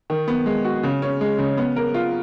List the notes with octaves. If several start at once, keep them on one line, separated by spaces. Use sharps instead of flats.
D#3
B3
G#3
F#4
C#3
C#4
G#3
C#3
B3
A#4
F4